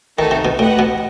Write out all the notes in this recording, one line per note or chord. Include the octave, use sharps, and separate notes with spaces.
D#3 A3 D#4 F#4 A4
C3
B2
A2 G4 B4 D#5 F#5
B2